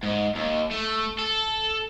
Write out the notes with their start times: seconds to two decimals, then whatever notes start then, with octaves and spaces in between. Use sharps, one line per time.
0.03 G#2
0.35 D#2
0.71 A3
1.19 A4